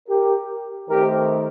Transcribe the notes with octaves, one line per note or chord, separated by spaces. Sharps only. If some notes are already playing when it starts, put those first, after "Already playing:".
G4 A#4
D#3 A3 C4 G4 A#4